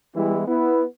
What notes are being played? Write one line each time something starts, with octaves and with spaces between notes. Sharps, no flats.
E3 G3 G#3 B3 E4
B3 E4